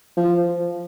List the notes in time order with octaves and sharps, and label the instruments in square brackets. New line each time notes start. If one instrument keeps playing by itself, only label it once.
[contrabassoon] F3